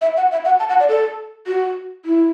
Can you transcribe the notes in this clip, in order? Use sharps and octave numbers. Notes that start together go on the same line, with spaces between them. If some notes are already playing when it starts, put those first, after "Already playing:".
E5
F#5
E5
F#5
A5
F#5
D5
A4
F#4
E4